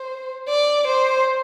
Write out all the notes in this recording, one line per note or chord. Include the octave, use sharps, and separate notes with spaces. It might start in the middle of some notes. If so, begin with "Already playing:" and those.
Already playing: C5
D5
C5